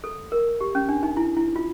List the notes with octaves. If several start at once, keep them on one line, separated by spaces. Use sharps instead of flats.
A4
A#4
G4
C#4
D4
D#4
E4
E4
F4